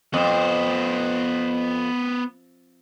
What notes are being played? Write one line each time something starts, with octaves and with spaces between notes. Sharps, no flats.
F2 B3 C5